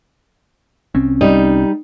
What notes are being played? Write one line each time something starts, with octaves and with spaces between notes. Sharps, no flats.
C2 C4 C#4
G3 D#4